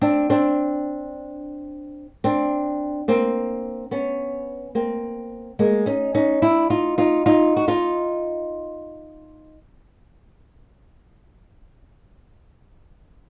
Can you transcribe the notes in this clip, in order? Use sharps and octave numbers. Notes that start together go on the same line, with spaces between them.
C4 D4
C4 D4
C4 D4
A#3 C4
B3 C#4
A#3 C4
G#3 A#3
C#4 D#4
C#4 D#4
D4 E4
D#4 F4
D#4 F4
D#4 F4
F#4
D#4 F4